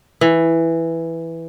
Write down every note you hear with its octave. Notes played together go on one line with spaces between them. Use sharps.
E3